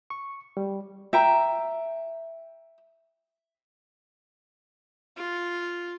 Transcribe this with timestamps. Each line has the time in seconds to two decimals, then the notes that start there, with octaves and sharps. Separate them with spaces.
0.10 C#6
0.57 G3
1.13 E5 G5 A#5
5.17 F4